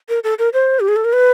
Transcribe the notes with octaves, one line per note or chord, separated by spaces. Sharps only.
A#4
A4
A#4
C5
G4
G#4
A4
A#4
B4